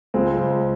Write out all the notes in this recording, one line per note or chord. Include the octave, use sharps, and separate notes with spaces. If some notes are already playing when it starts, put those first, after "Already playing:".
C#2 G#3 C4
C#2